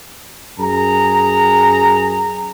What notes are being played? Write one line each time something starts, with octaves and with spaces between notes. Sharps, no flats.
F#2 G#4 A#5